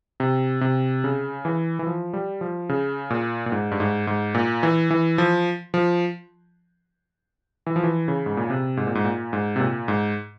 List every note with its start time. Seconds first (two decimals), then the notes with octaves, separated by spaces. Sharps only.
0.20 C3
0.61 C3
1.04 C#3
1.45 E3
1.79 E3
1.87 F3
2.13 G3
2.41 F3
2.69 C#3
3.10 A#2
3.46 A#2
3.52 G#2
3.71 G2
3.80 G#2
4.07 G#2
4.35 A#2
4.63 E3
4.91 E3
5.18 F3
5.74 F3
7.66 E3
7.76 F3
7.83 E3
8.08 C#3
8.26 G#2
8.37 A#2
8.50 C3
8.77 G#2
8.87 A#2
8.95 G#2
9.04 A#2
9.33 G#2
9.56 C3
9.60 A#2
9.88 G#2